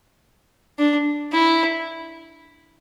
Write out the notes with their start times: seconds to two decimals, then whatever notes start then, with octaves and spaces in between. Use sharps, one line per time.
0.79 D4
1.32 E4